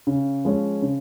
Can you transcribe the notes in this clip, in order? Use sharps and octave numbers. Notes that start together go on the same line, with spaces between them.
C#3
F3 G#3 C#4
C#3